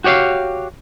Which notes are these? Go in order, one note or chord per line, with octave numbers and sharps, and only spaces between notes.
F#4 G4 C#5 D#5 F5